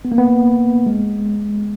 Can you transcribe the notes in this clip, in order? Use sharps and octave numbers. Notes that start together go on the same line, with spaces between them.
B3
A#3
B3
G#3